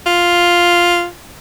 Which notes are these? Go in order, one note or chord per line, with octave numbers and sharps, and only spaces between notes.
F4